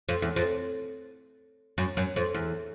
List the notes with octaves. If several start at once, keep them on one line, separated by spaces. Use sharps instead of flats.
F2
E2
F2
F#2
F#2
F2
E2